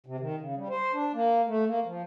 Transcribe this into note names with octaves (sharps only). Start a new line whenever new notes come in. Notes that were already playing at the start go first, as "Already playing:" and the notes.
C3
D#3
C#3
G3
C5
D4
A#3
A3
A#3
F3